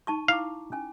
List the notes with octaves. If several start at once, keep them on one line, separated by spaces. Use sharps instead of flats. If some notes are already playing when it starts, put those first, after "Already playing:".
D#4 A5 C#6
E4 F5 A#5 D6
C#4 G#5